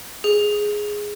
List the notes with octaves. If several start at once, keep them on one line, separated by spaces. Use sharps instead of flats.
G#4